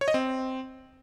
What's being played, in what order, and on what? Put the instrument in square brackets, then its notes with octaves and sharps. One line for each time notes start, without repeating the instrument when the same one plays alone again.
[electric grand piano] C#5
D#5
C4